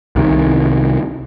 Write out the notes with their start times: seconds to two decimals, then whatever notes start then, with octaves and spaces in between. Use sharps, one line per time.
0.16 C2 C3 D#3